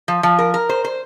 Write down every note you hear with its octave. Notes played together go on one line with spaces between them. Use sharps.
F3
F3
A#4
A#4
C5
C5